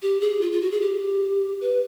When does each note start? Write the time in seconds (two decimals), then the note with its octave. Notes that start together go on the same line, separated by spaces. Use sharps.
0.02 G4
0.21 G#4
0.41 F4
0.52 F4
0.61 F#4
0.71 G#4
0.82 G4
1.61 B4